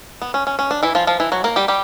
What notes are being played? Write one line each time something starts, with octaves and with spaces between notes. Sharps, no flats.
B3
C#4
C#4
C#4
D4
E3 E4
F3 F4
F3 F4
E3 E4
F#3 F#4
A#3 A#4
G3 G4
G3 G4